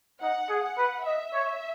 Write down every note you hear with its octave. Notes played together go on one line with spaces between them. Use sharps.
D#4 F#5
G#4
F#5
B4
D#5 E5
C#5